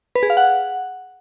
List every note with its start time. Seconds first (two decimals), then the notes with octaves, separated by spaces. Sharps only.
0.15 B4
0.23 G#4
0.30 F5
0.37 F#5